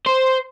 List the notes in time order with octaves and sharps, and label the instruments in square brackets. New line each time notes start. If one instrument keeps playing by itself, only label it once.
[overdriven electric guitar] C5